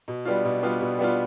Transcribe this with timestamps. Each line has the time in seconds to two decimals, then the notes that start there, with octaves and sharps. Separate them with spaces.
0.08 B2
0.25 G3 B3 D4 F4
0.45 B2
0.63 G3 B3 D4 F4
0.81 B2
0.99 G3 B3 D4 F4